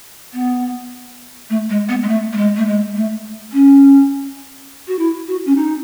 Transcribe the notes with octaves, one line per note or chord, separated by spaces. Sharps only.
B3
A3
G#3
B3
G#3
A3
A3
G#3
A3
G#3
A3
C#4
F#4
E4
F#4
C#4
D#4